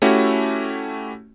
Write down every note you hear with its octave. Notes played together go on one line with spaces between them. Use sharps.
A3 C#4 E4 F#4 G4